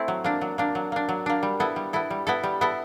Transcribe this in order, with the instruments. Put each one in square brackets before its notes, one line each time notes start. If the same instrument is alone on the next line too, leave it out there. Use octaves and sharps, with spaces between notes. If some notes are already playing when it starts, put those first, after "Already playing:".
Already playing: [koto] A3 C4 E4
F#3
A#3 D4
F#3
A#3 D4
F#3
A#3 D4
F#3
A#3 D4
G3
B3 E4 A4
G3
B3 E4 A4
G3
B3 E4 A4
G3
B3 E4 A4